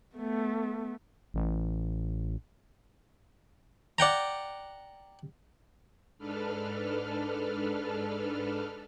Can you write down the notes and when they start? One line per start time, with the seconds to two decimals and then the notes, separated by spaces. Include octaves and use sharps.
0.16 A3 B3
1.34 A1
3.98 D5 F#5 G5 A#5
6.18 G#2 D4 A4 B4 F6